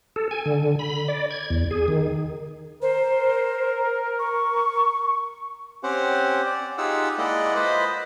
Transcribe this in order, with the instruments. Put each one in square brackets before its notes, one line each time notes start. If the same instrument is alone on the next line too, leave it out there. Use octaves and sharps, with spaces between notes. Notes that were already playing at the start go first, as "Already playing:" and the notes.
[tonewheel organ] A4
G#5
D3
B5
D5
G#6
E2
G#4
D#3
[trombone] A#4 [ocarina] C5
[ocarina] C#6
[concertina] C4 C#4 G4 C5 F#5
D5
D#4 F4 G4 G#4 F#5 E6
G#3 A#3 E4 D5 D#5 F#5
F4 B4 C5 D#5 B5